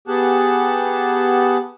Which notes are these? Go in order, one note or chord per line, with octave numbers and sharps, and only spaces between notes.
B3 G4 G#4 F#5 A5